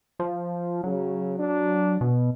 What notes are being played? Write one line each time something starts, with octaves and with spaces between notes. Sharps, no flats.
F3
C#3 F#3
D4
B2